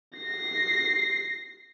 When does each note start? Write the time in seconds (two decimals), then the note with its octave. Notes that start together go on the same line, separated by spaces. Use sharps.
0.18 A#6 C7